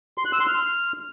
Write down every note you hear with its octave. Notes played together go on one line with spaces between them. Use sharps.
C6
F#6
E6
C6
F6